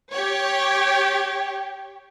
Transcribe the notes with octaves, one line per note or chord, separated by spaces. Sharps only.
G4 C#5